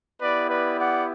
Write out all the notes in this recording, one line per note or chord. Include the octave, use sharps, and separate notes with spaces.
B3 E4 G4 B4 D5
B4 D5
D5 F#5